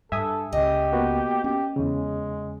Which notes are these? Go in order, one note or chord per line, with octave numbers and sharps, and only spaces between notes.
G2 A4 E5 G#5 D#6
C#2 C#3 G4 D#5
A#3 B3 F#4
C#4 G4
E2 C#3 G#3